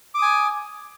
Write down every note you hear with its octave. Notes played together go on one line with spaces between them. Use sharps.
G#5 D6 D#6